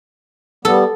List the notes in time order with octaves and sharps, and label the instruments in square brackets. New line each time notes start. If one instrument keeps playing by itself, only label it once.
[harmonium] G3 B3 [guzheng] A4